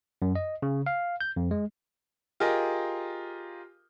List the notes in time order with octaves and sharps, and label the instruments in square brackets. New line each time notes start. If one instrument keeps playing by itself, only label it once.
[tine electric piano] F#2
D#5
C#3
F5
G6
F2
G#3
[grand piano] F4 G4 G#4 A#4 D#5